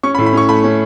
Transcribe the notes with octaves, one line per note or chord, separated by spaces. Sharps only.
C#4 C#6
B5
A2
B5
C#4 C#6
A3 B5
C#4